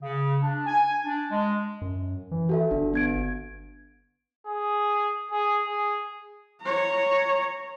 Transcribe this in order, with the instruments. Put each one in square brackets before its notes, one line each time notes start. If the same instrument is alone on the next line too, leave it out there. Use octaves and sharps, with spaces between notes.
[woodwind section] C#3
D4
G#5
D4
G#3
[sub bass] F#2
E3
[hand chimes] F#4 A4 E5
[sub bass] G1 [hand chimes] D4
[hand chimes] B3 G#6 D7
[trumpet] G#4
G#4
G#4
[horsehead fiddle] C#5 A#5